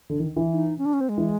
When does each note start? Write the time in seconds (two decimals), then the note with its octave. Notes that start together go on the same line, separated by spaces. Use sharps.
0.10 D3
0.20 D#3
0.36 E3
0.52 D#4
0.78 C#4
0.85 D4
0.93 C#4
1.01 C4
1.09 G#3
1.18 E3